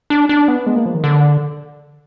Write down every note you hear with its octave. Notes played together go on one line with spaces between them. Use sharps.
D4
D4
B3
G#3
A#3
F3
D#3
D3